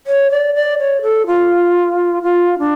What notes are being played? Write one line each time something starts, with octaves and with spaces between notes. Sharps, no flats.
C#5
D5
D5
C#5
A4
F4
F4
D4